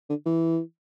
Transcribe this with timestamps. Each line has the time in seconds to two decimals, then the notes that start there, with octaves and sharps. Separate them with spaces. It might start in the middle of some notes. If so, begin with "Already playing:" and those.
0.09 D3
0.26 E3